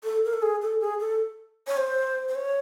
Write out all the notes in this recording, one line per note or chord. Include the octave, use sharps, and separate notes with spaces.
A4
A#4
A4
G#4
A4
G#4
A4
C#5
C5
C5
C#5